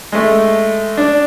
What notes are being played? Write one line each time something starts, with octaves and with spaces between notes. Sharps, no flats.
G#3 A3
D4